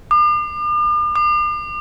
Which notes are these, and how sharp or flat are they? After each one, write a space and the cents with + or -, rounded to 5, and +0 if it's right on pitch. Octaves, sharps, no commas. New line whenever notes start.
D6 +45
D6 +45